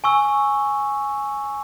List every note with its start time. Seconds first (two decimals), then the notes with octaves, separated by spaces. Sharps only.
0.04 G#5 C#6 E6